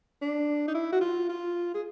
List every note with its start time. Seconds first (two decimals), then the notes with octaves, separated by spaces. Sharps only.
0.22 D4
0.68 D#4
0.74 E4
0.92 F#4
1.01 F4
1.29 F4
1.75 G#4